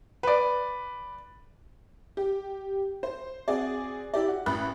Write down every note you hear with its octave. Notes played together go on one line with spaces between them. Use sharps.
B4 D5
G4
C5
C4 F#4 G#4 D5
E4 G4 D5
F#4
A1 B5 F#6